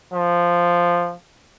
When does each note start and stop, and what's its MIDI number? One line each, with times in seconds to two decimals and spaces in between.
0.14 1.16 53